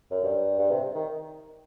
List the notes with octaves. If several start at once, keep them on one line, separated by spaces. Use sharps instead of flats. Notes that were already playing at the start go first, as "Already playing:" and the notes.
F#2
G2
G2
C3
D#3